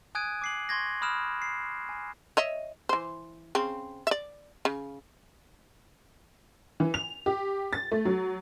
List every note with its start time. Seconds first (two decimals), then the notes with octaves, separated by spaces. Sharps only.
0.15 G#5 D#6 F#6 G#6 D7 D#7
0.42 D6 C7 F#7
0.69 C6 C#6 G#6 A#6
1.02 B5 D#6 F6 F#6 D7 E7
1.42 C7
1.89 G#5
2.37 C#5 D#5 E5
2.89 E3 C5
3.55 C#3 C4
4.07 D5 E5
4.65 C#3
6.80 E3
6.94 F7
7.26 G4
7.73 A6
7.92 A3
8.05 F#3